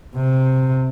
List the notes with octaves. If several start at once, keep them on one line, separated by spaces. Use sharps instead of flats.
C3